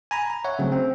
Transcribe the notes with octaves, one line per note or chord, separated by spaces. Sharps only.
G#5 A#5 B5
A#5
C#5 E5 F#5
C#3 F#3 A3 C4
C4 C#4